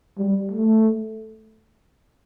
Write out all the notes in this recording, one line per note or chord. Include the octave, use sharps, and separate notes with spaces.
G3
A3